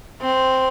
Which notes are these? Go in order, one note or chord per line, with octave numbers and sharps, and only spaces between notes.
C4